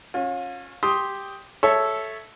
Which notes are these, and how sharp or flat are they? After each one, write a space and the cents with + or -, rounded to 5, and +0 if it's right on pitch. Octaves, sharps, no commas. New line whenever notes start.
C#4 -15 F4 +35
G4 +5 C6 +0 D#6 +15
A4 -10 C#5 +0 E5 +0